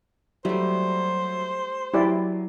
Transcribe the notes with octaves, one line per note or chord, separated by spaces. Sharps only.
F#3 G3 A3 C5 E5
F#3 E4 G4 D5